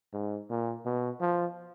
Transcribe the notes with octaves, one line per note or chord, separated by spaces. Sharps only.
G#2
A#2
B2
F3